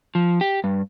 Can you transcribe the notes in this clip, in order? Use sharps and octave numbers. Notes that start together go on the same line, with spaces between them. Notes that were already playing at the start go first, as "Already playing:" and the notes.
F3
G4
G2